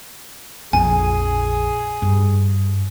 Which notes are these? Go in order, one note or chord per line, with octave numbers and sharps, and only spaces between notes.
A#1 F2 G#4 G#5
G2